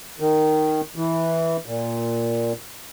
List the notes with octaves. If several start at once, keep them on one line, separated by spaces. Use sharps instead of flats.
D#3
E3
A#2